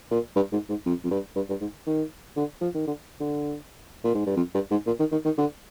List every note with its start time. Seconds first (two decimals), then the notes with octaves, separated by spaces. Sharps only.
0.11 A#2
0.36 G2
0.52 G#2
0.70 G#2
0.86 F2
1.04 F2
1.11 G2
1.36 G2
1.49 G2
1.61 G#2
1.87 D#3
2.37 D3
2.61 F3
2.75 D#3
2.87 D3
3.20 D3
4.04 A#2
4.15 G#2
4.26 G2
4.36 F2
4.54 G2
4.71 G#2
4.87 A#2
4.99 D#3
5.12 D#3
5.25 D#3
5.38 D3